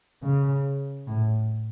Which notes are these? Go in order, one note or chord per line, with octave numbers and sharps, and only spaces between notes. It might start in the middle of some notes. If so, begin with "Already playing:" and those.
C#3
A2